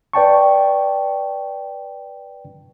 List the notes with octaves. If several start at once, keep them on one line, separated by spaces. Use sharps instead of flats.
B4 D5 G5 A5 C#6